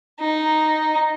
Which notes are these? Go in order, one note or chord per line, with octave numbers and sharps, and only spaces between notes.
D#4